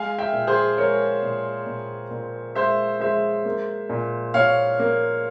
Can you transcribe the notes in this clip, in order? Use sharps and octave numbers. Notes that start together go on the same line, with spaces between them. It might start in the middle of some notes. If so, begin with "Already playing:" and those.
Already playing: G#3 F5 G#5
E5 G5
A#2
G#4 C5
G#3 A#4 C#5
A#2
A#2
A#2
G#3 C5 E5
G#3 C5 E5
A#3
A#2
A#2 C#5 F5
A#3